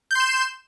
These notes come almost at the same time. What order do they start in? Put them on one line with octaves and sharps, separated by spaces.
G6 C6 E7